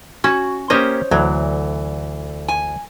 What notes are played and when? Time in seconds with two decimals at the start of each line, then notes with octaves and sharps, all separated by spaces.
0.24 C#4 F#4
0.70 A#3 C#4 G4 C5 C#5 D#5
1.11 D2 E3 F#3
2.48 G#5